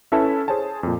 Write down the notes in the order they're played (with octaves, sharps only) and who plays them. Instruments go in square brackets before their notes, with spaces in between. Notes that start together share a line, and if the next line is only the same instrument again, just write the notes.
[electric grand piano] C#4 E4 A4 B4 E5 A5
G#4 C5 C#5 G#5 A5
F2 A#2